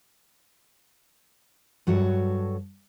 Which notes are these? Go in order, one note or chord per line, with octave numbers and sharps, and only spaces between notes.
G2 F#3 F#4 A4 C#5